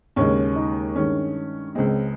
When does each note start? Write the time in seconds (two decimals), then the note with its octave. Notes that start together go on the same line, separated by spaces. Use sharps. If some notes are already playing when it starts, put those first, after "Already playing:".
0.16 D#2 C#3 G#3 C#4
0.56 D#4
0.95 G2 D#3 G#3 C#4
1.75 C#2 C#3 G#3 C4